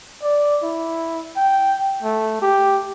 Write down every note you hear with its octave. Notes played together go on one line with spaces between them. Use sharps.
D5
E4
G5
A3
G4